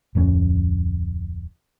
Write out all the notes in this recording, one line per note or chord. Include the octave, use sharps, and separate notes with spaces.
D1 F2 G#3 C#4